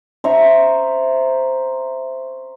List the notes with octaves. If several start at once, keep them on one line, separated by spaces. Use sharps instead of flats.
C5 E5 A#5 C#6